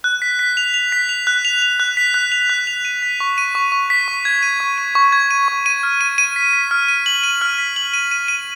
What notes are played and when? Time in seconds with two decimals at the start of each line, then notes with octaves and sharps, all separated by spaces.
0.04 F#6
0.22 B6
0.39 B6
0.57 F7
0.74 F7
0.92 B6
1.09 F7
1.27 F#6
1.45 F7
1.62 F7
1.80 F#6
1.97 B6
2.14 F#6
2.32 F7
2.50 F#6
2.67 F7
2.85 D#7
3.03 B6
3.20 C#6
3.38 D#7
3.55 C#6
3.72 C#6
3.90 B6
4.08 C#6
4.25 G#6
4.43 D#7
4.60 C#6
4.78 D#7
4.95 C#6
5.12 G#6
5.31 D#7
5.48 C#6
5.66 D#7
5.83 F6
6.01 D#7
6.18 D#7
6.36 B6
6.53 B6
6.71 F6
6.88 D#7
7.06 F#7
7.23 D#7
7.41 F6
7.59 B6
7.76 F#7
7.94 D#7
8.11 D#7
8.28 D#7